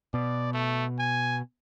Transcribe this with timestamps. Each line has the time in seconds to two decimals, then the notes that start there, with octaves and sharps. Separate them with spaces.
0.14 B2 D5
0.53 A3
0.99 G#5